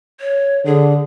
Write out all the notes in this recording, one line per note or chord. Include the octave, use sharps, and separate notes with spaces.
C#5
D3 G#4